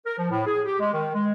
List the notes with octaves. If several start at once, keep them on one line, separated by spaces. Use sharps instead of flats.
A#4
F3
A2
G#4
G4
G#3
D#3
G#3